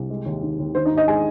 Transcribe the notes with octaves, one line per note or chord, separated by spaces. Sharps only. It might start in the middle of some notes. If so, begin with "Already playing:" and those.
Already playing: C2
G#3
D#2
D#3
D#2
D#3 C5
D#4 D#5
G#2
D#4 D#5
G#3 G#4 G#5